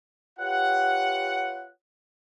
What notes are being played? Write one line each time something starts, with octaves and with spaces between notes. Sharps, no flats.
F4 G4 B4 C#5 F#5